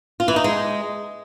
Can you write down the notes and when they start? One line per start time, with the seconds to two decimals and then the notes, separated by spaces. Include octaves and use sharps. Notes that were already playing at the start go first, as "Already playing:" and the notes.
0.20 F4
0.28 E3
0.36 D#4
0.44 G#3